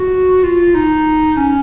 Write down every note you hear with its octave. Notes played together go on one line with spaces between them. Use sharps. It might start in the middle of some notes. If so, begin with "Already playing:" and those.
Already playing: F#4
F4
D#4
C#4